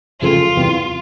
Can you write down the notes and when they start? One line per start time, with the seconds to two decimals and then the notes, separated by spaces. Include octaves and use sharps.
0.21 F2 C#3 F3 A3 C4 F4
0.56 E2 C3 E3 G3 C4